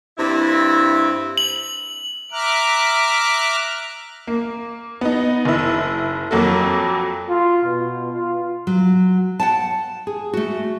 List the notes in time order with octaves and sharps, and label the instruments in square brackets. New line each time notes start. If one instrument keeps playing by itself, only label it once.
[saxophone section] G2 C4 E4
[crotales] F#7
[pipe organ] E5 A#5 D6 F6 F#6
[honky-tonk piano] A#3
B3 D#4
F#1 E4
F2 F#3 A#3 F#4 A4
[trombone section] F4
B2
F4
[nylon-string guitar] F#3
F#5 G5 A5
G#4
A3 F#4